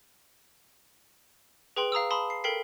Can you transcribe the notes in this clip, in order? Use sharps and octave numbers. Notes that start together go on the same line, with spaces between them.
G#4 B4 G5 C6 F#7
F5 A#5 D#6 E6
A5 B5 C6 D#6
C7
A4 A#4 G5 B6 C7